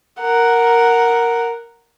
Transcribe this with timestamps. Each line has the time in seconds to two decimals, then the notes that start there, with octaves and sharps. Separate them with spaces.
0.20 A#4 F#5